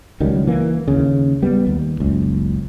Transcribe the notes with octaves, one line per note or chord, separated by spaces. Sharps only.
C#2 D#3 F#3 G3
E3 A#3
D#2 C#3
G3 B3
D#2
F#1 C#2